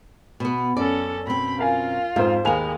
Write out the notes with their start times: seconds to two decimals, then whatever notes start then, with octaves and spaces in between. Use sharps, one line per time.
0.40 B2 B3
0.77 F#2 C#4 A4 D5
1.27 B2 C4 B5
1.59 F4 A#4 F5 G#5
2.16 F2 G#2 F3 C5 F5
2.45 D#2 G#3 A#4 B4 G#5 F7